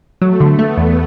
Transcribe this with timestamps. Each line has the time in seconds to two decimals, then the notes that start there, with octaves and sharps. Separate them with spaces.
0.22 F#3 A3
0.40 D3
0.59 A3 B3
0.77 E2